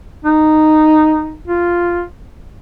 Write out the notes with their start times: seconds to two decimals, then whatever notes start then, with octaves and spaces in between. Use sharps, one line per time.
0.25 D#4
1.48 F4